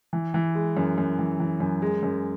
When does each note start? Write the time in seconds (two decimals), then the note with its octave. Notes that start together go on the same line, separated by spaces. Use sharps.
0.13 E3
0.34 E3
0.55 G#3
0.77 F#2
0.98 F#2
1.19 E3
1.40 E3
1.60 F#2
1.82 G#3
2.03 F#2